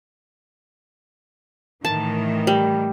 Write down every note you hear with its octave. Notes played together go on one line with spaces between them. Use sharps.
A2 D#3 E3 A5
G3